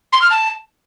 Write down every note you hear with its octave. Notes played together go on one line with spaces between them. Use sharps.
C6
F6
A5